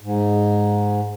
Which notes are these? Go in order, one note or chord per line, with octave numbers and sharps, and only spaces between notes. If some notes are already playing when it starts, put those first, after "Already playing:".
G#2